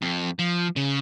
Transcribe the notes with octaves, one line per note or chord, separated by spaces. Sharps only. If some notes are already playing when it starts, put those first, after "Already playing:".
F2
F3
C#3